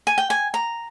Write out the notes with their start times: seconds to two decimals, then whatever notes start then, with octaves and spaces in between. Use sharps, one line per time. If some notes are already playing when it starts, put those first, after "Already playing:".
0.07 G#5
0.18 G5
0.30 G#5
0.54 A#5